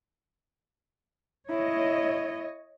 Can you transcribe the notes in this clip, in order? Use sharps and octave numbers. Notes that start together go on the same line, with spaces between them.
E4 C#5 D#5